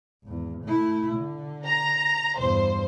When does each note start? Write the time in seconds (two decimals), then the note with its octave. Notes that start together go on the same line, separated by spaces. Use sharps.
0.24 G#1 E2
0.65 A3 E4
1.16 D3
1.65 A#5
2.37 E2 G2 C5